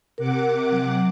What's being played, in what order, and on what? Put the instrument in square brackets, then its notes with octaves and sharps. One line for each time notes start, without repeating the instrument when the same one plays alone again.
[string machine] C3 F#5 D6 [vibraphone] A#4
[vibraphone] F#3